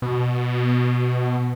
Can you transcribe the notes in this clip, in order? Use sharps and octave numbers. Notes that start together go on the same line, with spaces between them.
B2